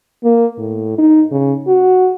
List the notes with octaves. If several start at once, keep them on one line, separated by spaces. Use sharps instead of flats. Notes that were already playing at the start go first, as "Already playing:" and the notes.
A#3
A2
D#4
C#3
F#4